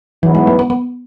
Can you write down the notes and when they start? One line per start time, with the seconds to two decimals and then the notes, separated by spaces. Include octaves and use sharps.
0.22 G#2 E3 F#3 B3 E4
0.35 G#3
0.47 A3
0.59 B3
0.70 B3